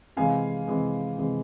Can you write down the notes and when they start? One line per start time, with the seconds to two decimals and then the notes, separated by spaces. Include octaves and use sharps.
0.17 C3 E3 G#3 F5 G#5
0.68 C3 E3 G#3
1.18 C3 E3 G#3